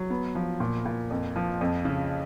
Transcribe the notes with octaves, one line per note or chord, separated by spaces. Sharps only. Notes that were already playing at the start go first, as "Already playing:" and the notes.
Already playing: F#3
B3
F3
A#2
A#2
F2
F3
F2
C#3